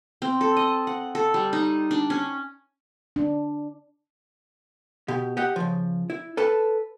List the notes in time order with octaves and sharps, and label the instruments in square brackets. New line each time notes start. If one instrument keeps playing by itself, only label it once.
[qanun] C4
A4
D#5
F#5
A4
G3
D#4
D4
C#4
[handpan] D4
[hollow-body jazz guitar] B2 G4
G4 D#5 F#5
C#3 F3
E4
A4 B4 A5